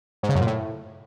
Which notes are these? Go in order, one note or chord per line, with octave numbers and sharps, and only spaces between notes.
G#2
C#3
F#2
A#2
A2